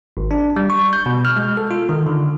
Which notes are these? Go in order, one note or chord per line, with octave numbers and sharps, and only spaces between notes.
G#1
D4
G3
C#6
G6
B2
F6
G#3
A4
F4
D#3
D3